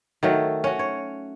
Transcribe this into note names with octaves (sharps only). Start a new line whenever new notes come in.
D#3 F#3 A3
C#4 F#4
C#5